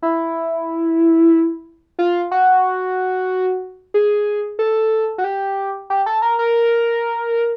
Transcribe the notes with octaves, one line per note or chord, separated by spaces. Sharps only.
E4
F4
F#4
G#4
A4
F#4
G4
G4
A4
A#4
A#4